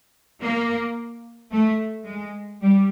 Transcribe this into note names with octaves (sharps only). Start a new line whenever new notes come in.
A#3
A3
G#3
G3